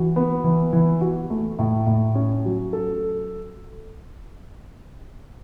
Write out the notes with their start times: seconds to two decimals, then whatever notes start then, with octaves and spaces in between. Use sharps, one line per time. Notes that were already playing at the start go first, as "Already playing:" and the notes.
Already playing: E3 F#4
0.16 B3
0.44 E3
0.73 E3
1.01 F#4
1.30 A3
1.59 A2
1.87 A2
2.15 C#4
2.45 F#3
2.73 A4